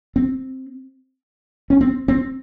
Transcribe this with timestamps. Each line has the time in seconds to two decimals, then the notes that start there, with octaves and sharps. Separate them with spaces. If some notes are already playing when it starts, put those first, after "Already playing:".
0.16 C4
1.70 C#4
1.81 C4
2.08 C4